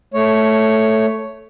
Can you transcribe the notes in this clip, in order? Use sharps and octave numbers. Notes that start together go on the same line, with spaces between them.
A3 C#5